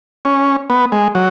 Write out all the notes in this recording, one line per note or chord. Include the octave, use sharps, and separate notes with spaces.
C#4
B3
G#3
F#3